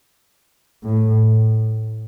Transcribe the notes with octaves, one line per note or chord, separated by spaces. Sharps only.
A2